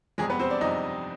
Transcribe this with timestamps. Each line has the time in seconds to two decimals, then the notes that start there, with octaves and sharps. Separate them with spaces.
0.18 F2 C3 G3 G#3 G#4
0.30 B3 B4
0.39 C4 C5
0.50 D4 D5
0.61 F2 C3 G3 D#4 D#5